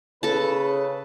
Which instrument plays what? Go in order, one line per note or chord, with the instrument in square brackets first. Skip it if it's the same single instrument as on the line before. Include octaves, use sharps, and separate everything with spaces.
[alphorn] C#3 [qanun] A4 A5 [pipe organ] B4